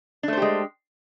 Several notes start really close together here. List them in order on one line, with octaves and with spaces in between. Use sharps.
D4 A3 C5 G4 G#3